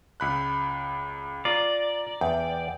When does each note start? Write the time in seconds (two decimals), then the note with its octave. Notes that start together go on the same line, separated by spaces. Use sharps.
0.20 C#2 B5 F#6
1.45 F4 D5 A#5
2.21 E2 G5